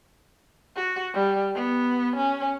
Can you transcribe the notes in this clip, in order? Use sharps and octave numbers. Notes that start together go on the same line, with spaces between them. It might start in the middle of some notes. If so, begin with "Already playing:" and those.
F#4
G3
B3
C#4